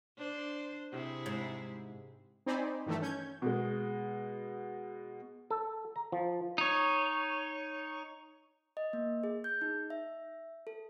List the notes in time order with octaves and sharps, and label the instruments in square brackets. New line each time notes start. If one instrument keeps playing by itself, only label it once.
[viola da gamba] D4 C5
C3 E4 G#4
[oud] G#2
[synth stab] C4 D#4 C5 D5 G#5 B5
G2 D#3 E3 A3
C#4 G6 G#6
[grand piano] B2 G#3
[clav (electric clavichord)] A4
A#5
F3
[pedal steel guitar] D#4 C#5
[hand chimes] D#5
A#3
G#4
G6
D#4
E5
A4